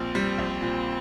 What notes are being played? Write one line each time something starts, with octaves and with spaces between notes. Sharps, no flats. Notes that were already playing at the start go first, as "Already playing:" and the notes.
Already playing: A#1 A#2 C4
G3
A#1
A#2